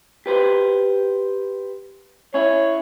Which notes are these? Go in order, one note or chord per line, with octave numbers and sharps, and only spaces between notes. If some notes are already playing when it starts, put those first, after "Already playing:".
G4 B4 C5
C#4 E4 C#5